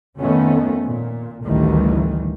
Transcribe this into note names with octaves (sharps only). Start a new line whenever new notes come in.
F2 D#3 A3 B3 C#4
A#2
A1 D2 D#3 E3 G3